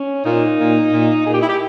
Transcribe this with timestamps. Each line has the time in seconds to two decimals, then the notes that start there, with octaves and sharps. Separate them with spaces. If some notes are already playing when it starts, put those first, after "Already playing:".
Already playing: C#4
0.25 A#2 D#4
0.59 A#2
0.92 A#2
1.26 A#2 G#4
1.33 G4
1.41 E4
1.48 G4